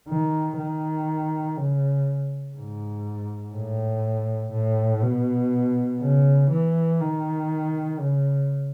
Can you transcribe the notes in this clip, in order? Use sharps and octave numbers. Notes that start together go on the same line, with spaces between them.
D#3
D#3
C#3
G#2
A2
A2
B2
C#3
E3
D#3
C#3